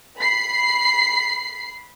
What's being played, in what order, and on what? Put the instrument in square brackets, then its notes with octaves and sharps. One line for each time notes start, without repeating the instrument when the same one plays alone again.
[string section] B5 C7